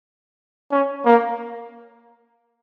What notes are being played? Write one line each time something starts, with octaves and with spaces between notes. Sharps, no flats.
C#4
A#3